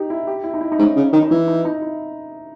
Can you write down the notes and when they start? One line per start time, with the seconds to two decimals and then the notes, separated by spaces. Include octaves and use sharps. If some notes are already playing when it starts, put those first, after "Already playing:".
Already playing: D#4 G4
0.10 E4
0.27 G4
0.44 E4
0.54 D#4
0.61 E4
0.72 D#4
0.79 G#2 C#4
0.96 C#3
1.13 D#3
1.22 D#4
1.30 E3 E4
1.48 D#4
1.65 D#4
1.82 E4